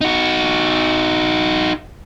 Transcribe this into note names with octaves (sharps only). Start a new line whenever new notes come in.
D#4 F#4